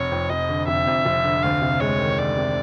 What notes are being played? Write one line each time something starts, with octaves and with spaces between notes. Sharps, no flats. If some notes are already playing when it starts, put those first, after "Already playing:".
Already playing: F1 C#5
F2
F1 D#5
D3
F1 E5
F2
F1
D3
D2 F5
C3
G#3 C#5
D#3
D2 D5
C3